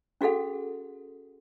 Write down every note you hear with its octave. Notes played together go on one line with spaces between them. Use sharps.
C#4 F#4 G#4 A4 F#5